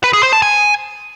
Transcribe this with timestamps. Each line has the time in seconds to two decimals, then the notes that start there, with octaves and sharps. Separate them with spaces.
0.04 B4
0.13 G#4
0.23 C5
0.33 A5
0.42 G#5